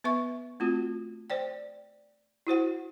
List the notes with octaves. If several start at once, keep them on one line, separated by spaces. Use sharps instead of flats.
B3 B4 E5 C#6
A3 C4 F4 F#4
C5 D5 G5
E4 F#4 C5 F#5